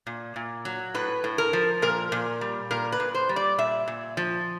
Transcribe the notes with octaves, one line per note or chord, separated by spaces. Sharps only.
A#2
A#2
F#3
A2 B4
A2
A#4
F3
A#2 A#4
A#2
G3
A#2 A#4
B4
A#2
C5
G3
D5
A#2 E5
A#2
F3